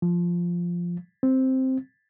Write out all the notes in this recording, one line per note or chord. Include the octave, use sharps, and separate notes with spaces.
F3
C4